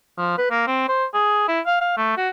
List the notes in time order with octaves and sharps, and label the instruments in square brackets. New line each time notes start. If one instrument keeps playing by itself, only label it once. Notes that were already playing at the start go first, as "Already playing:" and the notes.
[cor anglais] F3
B4
A#3
C4
C5
G#4
E4
F5
F5
A3
F#4